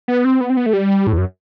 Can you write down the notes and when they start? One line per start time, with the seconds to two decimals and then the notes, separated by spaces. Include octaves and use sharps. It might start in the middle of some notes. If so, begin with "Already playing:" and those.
0.08 B3
0.25 C4
0.41 B3
0.50 C4
0.57 B3
0.66 A3
0.73 G3
1.07 A2
1.13 E2
1.18 F#2